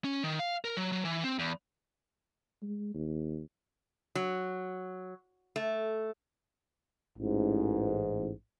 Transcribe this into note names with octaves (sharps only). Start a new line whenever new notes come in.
C#4
D#3
F5
A#4
F#3
F#3
E3
C4
E2
G#3
D#2
F#3
A3
A1 G#2